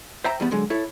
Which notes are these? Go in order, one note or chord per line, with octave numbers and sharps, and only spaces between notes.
C5 E5 G5 A#5
E2 G3 B3
D3 F#3 G#3
E4 A4 C#5